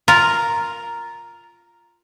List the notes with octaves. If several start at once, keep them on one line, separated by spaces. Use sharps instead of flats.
F4 A#4 A#5